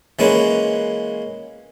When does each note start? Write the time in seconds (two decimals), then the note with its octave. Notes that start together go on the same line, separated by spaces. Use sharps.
0.19 E3 G#3 A#3 C#4 F4 B4